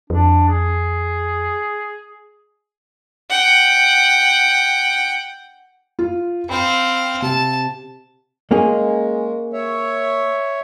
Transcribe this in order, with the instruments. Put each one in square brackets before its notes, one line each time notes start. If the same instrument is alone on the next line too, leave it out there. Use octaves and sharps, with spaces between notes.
[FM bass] F2 [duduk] D4
[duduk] G#4
[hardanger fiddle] F#5 G5
[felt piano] F4
[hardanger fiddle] C4 F5 [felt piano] G5 B5
[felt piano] C3 [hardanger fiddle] A5
[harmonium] G#3 [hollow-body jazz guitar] A#3 C#4 G#4
[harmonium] C#5 E5